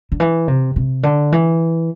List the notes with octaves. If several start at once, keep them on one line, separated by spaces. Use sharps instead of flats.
D3
E3
C3
C3
D3
E3